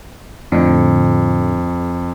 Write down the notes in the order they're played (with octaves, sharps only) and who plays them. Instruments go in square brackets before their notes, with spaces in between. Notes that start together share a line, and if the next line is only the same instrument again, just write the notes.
[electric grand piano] F2 [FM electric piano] A2 D3